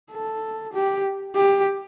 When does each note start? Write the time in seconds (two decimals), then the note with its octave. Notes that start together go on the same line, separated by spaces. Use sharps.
0.11 A4
0.73 G4
1.35 G4